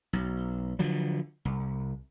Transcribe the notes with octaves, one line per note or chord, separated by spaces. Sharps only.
B1
D3 F3 F#3
C2